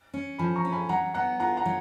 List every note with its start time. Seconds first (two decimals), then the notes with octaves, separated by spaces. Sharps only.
0.14 C#4
0.38 F3 G#5 B5
0.56 A#5 C#6
0.65 C#4
0.72 G#5 B5
0.89 F#3 F#5 A#5
1.14 B3 F#5 A#5
1.40 F4 F#5 A#5
1.57 F#5 A#5
1.66 F#3